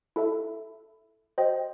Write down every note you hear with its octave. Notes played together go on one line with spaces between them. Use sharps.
E4 A4 E5
F#4 C5 D#5 G5